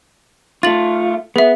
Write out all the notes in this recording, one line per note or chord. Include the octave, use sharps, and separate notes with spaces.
A3 F4 A6 F#7
B3 G#4 E5